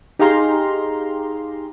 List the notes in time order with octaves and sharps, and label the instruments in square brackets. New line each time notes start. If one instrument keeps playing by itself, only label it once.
[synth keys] D#4 G4 G#4 F5 A#5 C6